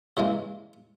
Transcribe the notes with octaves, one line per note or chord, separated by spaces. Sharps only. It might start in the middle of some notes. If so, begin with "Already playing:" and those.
C#3 E3 G#3 A#3